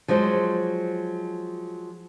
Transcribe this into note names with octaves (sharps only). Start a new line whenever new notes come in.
F3 F#3 G#3 C5